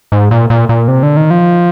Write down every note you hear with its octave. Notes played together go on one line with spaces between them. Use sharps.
G#2
A#2
A#2
A#2
C3
D3
D#3
F3